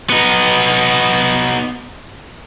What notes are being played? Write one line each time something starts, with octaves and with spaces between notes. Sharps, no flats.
B3 D#4